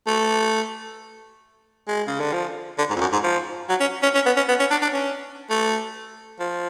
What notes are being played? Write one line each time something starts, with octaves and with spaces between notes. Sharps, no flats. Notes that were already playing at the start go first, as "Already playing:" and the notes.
A3
G#3
C#3
D3
F3
D3
G#2
F2
F#2
G#2
F3
F#3
C#4
C#4
C#4
B3
C#4
B3
C#4
D4
D4
C#4
A3
F3